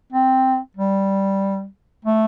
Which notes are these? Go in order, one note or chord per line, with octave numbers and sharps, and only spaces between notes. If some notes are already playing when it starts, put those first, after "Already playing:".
C4
G3
A3